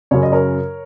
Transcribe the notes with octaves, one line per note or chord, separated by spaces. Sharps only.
F#2 C#3 C#5
D#5
A#4 C#5